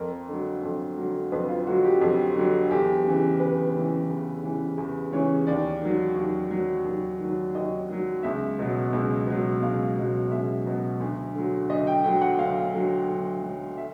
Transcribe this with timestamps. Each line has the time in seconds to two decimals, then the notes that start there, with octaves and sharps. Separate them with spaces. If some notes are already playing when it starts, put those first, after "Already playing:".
Already playing: F2 A#4
0.29 D3 F#3
0.63 F2
0.98 D3 F#3
1.32 F2 B4
1.49 F4
1.66 D3 F#3 F#4
1.84 G4
2.01 F2
2.36 D3 F#3
2.70 E2 G4
3.04 C#3 E3
3.40 E2 B4
3.75 C#3 E3
4.09 E2
4.44 C#3 E3
4.78 E2
5.12 C#3 E3 C#5
5.47 D#2 D5
5.81 D#3 F#3
6.16 D#2
6.51 D#3 F#3
6.85 D#2
7.20 D#3 F#3
7.55 D#2 D#5
7.88 D#3 F#3
8.23 C#2 E5
8.59 B2 F#3
8.93 C#2
9.27 B2 F#3
9.62 C#2 F5
9.97 B2 F#3
10.31 C#2 E5
10.66 B2 F#3
11.00 D2
11.35 D3 F#3
11.70 D2 D#5
11.87 G5
12.04 D3 F#3 G5
12.21 F#5
12.38 D2 F5
12.74 D3 F#3
13.08 D2
13.42 D3 F#3
13.77 E5